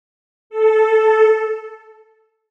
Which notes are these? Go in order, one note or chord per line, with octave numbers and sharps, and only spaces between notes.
A4